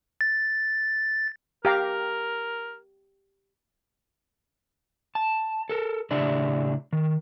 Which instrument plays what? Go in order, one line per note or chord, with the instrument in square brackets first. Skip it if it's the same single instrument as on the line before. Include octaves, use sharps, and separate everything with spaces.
[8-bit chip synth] A6
[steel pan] G4 F5 A#5 [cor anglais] A#4
[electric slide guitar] A5
A4 A#4
A2 C#3 D4 G4 D5 E5
D#3